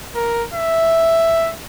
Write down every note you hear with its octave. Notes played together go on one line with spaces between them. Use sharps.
A#4
E5